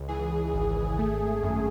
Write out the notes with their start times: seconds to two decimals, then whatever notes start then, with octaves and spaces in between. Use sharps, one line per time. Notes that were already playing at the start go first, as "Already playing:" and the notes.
Already playing: C#2
0.09 E3 G#4
0.54 G#1
0.99 A3
1.43 F#2